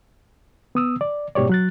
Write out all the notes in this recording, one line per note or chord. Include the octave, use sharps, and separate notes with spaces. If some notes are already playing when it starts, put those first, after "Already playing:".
B3 D#6 E6
D5
G#2 B2 G4 C#5 D5
F#3 F#6 A6